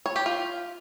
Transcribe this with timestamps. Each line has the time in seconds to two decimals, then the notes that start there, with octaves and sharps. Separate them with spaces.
0.06 C#5
0.16 G4
0.26 F4